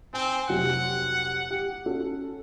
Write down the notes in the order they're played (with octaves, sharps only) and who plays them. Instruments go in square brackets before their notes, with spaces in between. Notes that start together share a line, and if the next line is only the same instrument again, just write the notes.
[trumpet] C4 [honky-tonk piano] G#5
[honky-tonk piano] F1 F#3 G4 [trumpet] F#5
[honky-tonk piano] G4
C#4 F#4 A4